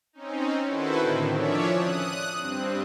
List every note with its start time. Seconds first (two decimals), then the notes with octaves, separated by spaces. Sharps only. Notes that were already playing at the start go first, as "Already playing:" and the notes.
0.13 C4 C#4 D#4
0.66 D#3 E4 F#4 A4 B4 C5
1.01 A2 D3 D#3 C4
1.32 F3 C#4 D4 C#5 D5 E5
1.68 D#6 F#6
2.39 G2 C4